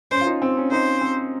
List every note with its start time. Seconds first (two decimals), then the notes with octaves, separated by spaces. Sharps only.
0.11 C#4 C5
0.21 F4
0.27 D#4
0.42 C4
0.57 C#4
0.71 D#4 C5
1.01 C4